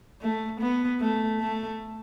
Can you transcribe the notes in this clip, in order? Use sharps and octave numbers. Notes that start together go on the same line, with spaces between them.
A3
B3
A3
A3